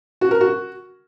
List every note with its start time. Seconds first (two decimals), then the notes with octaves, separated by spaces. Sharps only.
0.21 F#4
0.31 A#4
0.41 F#4